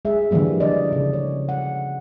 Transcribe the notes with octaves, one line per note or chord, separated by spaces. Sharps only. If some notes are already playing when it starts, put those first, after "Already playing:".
G#3 G#4 E5
D3 E3 F3 G3 A#3
D3 D5 D#5
C#3
C#5
F#5